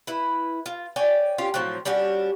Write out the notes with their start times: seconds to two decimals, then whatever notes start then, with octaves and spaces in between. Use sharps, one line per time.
0.07 E4 B4
0.66 F4
0.96 C#5 D5 G5 G#5
1.38 C#4 F4 G4
1.54 A2 F3 F#3 C4
1.85 G3 C#4 D4 F#4